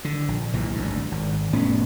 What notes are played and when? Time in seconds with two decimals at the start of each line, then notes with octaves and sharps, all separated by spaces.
0.05 D3
0.28 A#1
0.53 B1 A#2 E3
0.74 G#1 D2 G2
1.12 G#1
1.53 F1 A2 B3 C#4